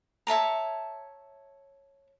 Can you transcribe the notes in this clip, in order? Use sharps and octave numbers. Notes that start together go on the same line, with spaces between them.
C#5 E5 A5 A#5